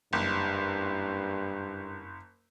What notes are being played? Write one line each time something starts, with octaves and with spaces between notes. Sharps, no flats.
F#1 G2